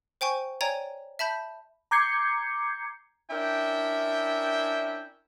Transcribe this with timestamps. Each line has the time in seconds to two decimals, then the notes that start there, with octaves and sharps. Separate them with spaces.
0.21 C5 G5 G#5 C#6
0.61 C#5 D5 G5 G#5 A#5 G#6
1.19 E5 A5 B5 G6
1.91 A#5 D6 G6 G#6 C7 C#7
3.31 C#4 D4 E4 A#4 E5 G5